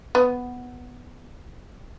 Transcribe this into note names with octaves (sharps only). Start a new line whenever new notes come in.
B3